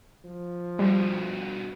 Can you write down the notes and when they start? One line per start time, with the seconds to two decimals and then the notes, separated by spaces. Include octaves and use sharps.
0.24 F3
0.79 G2 B2 G3